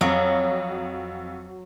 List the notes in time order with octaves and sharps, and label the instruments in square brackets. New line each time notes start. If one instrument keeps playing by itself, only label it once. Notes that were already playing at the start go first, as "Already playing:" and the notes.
[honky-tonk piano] F2 [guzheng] F#3